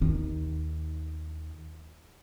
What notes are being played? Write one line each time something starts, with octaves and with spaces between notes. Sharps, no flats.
D#2 D#3